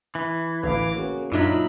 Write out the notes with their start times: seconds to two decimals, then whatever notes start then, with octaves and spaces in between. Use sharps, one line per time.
0.15 E3
0.63 A1 D2 B4 F5 D6
0.95 C#3 A#3 F#4
1.32 F#2 A#2 F#3 D4 D#4 F4 E5 B5